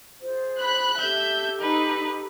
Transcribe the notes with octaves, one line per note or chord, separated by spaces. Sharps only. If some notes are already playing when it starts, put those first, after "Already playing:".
F4 G#4 C5
B5 F#6
G4 A4 E5 G6
D#4 B4